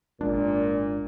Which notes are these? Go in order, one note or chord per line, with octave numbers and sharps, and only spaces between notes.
G#1 A#2 G#3 D4